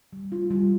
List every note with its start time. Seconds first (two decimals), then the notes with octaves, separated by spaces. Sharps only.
0.13 G3
0.32 F4
0.51 G3